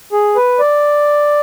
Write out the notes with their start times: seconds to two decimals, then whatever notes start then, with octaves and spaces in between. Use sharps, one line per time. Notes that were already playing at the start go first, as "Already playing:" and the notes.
0.12 G#4
0.36 B4
0.59 D5